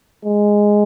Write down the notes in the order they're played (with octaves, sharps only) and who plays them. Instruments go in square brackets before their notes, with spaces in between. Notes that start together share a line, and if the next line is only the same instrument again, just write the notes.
[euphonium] G#3